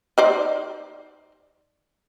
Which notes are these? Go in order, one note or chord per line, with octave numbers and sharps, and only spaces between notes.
D#4 C5 D5